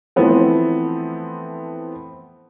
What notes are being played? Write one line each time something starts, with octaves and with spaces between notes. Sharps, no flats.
E3 F3 A3 B3 C4